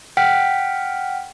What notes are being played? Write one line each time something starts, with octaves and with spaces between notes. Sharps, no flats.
F#5 G5 F6 B6